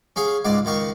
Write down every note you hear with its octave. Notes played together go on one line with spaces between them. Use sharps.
C#4 G#4 F5
C#2 G#2 D5 F5
C#2 D#3 F5 C#6